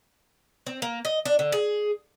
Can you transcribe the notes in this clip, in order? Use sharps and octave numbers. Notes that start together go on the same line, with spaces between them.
C4
A#3
D#5
D4
D3
G#4